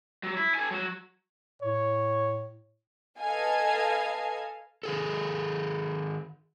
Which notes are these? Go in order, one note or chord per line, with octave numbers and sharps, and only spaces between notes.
F#3
E4
A4 G#5
F#3 F#4
A2 C#5
A4 B4 D#5 F5 G#5
D#3 G#4 A4